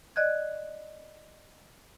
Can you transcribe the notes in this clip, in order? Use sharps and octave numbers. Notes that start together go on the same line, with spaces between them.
D5 D#5 F#6 G#6